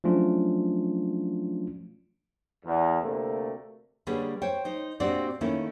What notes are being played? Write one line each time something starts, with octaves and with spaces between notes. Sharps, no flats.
F3 F#3 A3 C#4 D4 F4
E2
D2 C3 A3 A#3
D3 G3 A#3 G#4 B4 C#5
C5 C#5 G5
D#4 C5
A#2 C4 D4 F#4 G4 D5
D#3 A3 A#3 C#4 D#4 E4